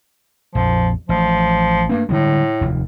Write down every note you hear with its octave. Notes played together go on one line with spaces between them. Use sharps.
A#1 F2 F3
A1 F3
G2 A3 A#3 C4
A2 D3 G3 G#3
F1 D#2